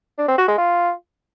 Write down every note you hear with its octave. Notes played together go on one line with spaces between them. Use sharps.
D4
C4
F#4
G#3
F4